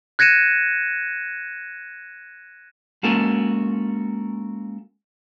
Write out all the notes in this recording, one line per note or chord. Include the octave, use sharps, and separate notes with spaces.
F#6 G#6 A#6 C#7 D#7 E7
G#3 A#3 C#4 F#4 A4 A#4